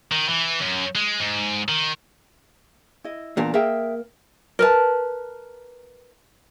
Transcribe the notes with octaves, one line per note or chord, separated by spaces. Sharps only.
D#3
E3
F#2
G#3
G#2
D#3
E4 D#5
E2 A#2 D4 A#4
A#3 G#4 E5 G5
A#4 B4 A5